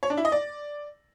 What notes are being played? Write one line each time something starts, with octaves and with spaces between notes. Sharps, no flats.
C#5
D4
E4
D#5
D5